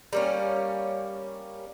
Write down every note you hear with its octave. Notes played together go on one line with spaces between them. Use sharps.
G3 A#3 C#4